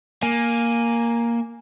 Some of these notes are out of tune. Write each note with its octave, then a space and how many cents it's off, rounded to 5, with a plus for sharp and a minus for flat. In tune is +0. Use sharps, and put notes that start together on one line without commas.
A#3 +0 G#5 +0